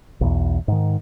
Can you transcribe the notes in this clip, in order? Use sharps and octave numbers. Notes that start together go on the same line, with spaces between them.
B1 E2
G#2 D#3